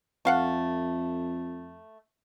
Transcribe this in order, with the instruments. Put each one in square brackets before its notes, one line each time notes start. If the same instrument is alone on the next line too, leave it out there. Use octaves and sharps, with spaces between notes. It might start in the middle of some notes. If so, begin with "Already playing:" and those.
[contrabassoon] F2 [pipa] A3 F5 F#5